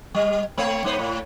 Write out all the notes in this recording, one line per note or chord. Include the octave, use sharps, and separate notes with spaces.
G3
A3 C4 C#5
G#2 B3 C5
A2